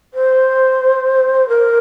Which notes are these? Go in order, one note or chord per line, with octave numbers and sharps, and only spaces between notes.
C5
A#4